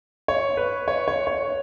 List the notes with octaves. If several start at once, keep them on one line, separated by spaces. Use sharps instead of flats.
C#5
B4
C#5
C#5
C#5